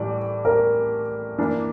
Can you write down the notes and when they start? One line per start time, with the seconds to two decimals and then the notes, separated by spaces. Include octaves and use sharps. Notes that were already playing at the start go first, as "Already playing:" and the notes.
Already playing: A2 E3 G3 D5
0.45 A#4
1.39 E3 A#3 D4